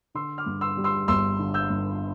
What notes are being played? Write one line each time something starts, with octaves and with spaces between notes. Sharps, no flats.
D3 C6 E6
D6 F6
G2
C6 E6
G3
C6 E6
G1 C6 E6
D3
E6 G6
G2